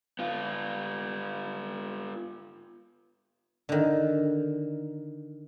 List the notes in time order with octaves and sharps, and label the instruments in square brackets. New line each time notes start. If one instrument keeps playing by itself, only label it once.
[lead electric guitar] B3 F4
[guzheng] D3 D#3